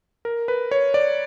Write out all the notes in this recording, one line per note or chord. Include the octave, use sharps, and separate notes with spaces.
A#4
B4
C#5
D5